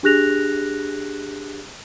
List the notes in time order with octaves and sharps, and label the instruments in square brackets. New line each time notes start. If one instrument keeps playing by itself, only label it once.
[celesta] D4 G4 G#4 F#6 A#6 F7